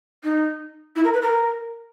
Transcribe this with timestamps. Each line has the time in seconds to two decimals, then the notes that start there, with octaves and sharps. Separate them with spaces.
0.23 D#4
0.96 E4
1.04 A#4
1.13 B4
1.22 A#4